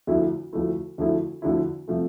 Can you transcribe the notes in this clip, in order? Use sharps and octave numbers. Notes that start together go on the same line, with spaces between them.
D2 D3 F3 A3 E4
D2 D3 F3 A3 E4
D2 D3 F3 A3 E4
D2 D3 F3 A3 E4
C3 F3 A3